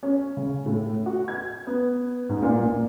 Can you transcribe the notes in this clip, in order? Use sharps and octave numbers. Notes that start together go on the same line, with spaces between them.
C#4
C#3
A2
F#4
G#6
B3
G#2
A#2
A#1